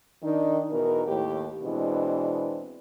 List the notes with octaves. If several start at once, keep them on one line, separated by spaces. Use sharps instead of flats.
D#3 D4 D#4
E2 B2 D#4 A#4
D#2 A2 G4
B2 E3 G#3 C4 D4